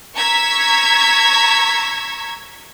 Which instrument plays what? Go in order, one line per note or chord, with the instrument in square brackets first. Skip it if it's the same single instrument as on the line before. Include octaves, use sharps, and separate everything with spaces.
[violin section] A#5 C#6 E6 G#6 B6